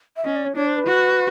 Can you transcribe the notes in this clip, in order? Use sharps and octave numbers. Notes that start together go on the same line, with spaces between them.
E5
C#4 D#5
D5
C#5
D4 C#5
C5
B4
F#4